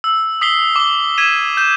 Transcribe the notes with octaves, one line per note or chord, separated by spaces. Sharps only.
E6
D#6 B6 C7 G7
D6 G7
G#6 B6 D#7 E7
G6 E7